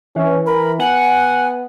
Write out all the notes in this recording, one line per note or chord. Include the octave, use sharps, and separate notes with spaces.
E3 C#4
A#4 B5
B3 F#5 G#5